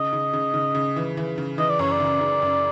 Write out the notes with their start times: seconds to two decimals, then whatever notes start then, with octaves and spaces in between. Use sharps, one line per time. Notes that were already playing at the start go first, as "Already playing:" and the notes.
Already playing: C#3 D#5
0.13 C#3
0.33 C#3
0.54 C#3
0.75 C#3
0.96 E3
1.17 E3
1.38 C#3
1.58 E3 D#5
1.69 D5
1.79 F#2 C#5
1.92 D5
2.00 C#3
2.21 C#3
2.42 F#2